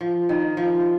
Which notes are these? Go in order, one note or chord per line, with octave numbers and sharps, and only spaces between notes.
F3
D#3
F3